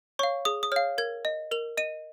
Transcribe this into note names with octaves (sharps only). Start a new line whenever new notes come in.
C#5 F5 C#6
G#4 D#6
D#6
C#5 F5 F6
A#4 G#6
D#5
A#4 F7
D#5 D#7